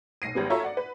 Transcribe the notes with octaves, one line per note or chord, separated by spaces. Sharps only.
B1 A#6 C7 D#7
G#1 G3 B3
F4 F#4 A4 C#5 E5 A#5
D5 F#5
B4